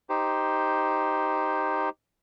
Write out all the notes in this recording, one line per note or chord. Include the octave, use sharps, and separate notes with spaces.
D#4 G4 C5